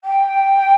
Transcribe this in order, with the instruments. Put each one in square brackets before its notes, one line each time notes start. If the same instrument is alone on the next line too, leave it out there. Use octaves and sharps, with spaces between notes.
[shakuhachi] G5